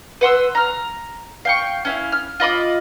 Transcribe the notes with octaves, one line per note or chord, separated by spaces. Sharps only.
B4 F#5 C6 E6
A#5 F6
F5 G5 C#6
C#4 E4 F5
F6
F4 D#5 B5 D6